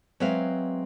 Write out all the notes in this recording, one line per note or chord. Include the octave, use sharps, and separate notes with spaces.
F#3 G#3 C4 B4 E5 F5